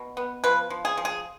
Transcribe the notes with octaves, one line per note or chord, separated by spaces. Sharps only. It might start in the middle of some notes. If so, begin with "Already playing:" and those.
Already playing: B2
B3
F3 B4
F3
G#4
F3
G#4